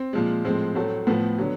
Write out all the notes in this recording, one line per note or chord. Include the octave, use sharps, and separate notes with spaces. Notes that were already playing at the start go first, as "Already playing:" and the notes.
Already playing: C4
A#2 F3 G#3
A2 F3 G#3 C4
A2 F#3 A3
A2 F3 A3 B3
D3 F#3